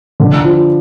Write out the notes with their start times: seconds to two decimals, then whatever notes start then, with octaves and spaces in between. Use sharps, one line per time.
0.20 D3
0.44 F3